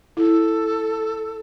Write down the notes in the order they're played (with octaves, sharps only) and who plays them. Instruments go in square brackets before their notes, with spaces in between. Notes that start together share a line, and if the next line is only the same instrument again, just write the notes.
[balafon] E4 [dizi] A4